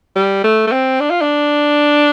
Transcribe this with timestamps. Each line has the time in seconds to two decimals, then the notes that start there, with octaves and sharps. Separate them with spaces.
0.16 G3
0.44 A3
0.67 A3
0.72 C4
1.00 D4
1.10 F4
1.21 D4